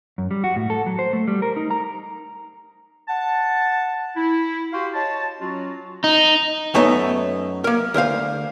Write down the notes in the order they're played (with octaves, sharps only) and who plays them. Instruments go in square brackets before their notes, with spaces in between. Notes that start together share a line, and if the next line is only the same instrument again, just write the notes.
[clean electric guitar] F#2
G3
F#4
A2
A4
F#3
C5
A3
G3
A#4
D#4
A#5
[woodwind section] F#5 A5
E4
F#4 G4 F5 G5 C6
C#5 D#5 A5
F#3 C#4 F4 F#4
[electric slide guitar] D#4
[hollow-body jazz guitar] F#2 A3 B3 D#4 C#5 A#5
A#3 A#4
D2 A#4 C5 F5